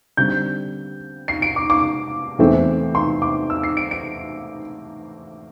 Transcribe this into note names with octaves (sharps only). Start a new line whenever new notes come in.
D3 G3 C4 G6
C7
D7
D6
D6
E2 E3 A3 C4
C6
D6
E6
C7
D7
D7